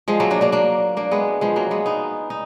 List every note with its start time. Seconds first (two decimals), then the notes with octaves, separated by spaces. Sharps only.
0.08 F3 G#3
0.20 F#3 A#3
0.31 A#3 D4
0.41 A#3 D4
0.52 A#3 D4
0.97 A#3 D4
1.11 G#3 B3
1.41 F3 G#3
1.56 F#3 A#3
1.71 G#3 B3
1.86 B3 D#4
2.30 D#4